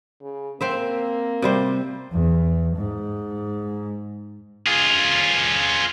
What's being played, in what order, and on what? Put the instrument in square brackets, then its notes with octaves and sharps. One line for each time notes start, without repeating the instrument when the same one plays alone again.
[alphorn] C#3
[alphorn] A#3 [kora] C4 C5 E5
[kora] C3 G3 C5
[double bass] E2
G#2
[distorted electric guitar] F4 G#4